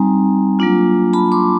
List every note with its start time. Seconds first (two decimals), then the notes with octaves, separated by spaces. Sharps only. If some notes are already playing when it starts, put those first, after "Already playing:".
Already playing: G3 C4 D#4 G#5 A#5
0.59 F#3 A#3 D4 F4
1.13 A5 B5
1.32 C6 D6